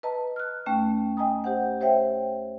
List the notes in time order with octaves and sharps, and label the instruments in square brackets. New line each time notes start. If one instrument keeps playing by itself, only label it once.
[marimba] B4 D#5 A5 A#5
F6 F#6
D#2 A3 C#4 G5
D#5 G5 G#5 A#5 D#6
G4 C5 F#5
G4 C5 C#5 E5 G5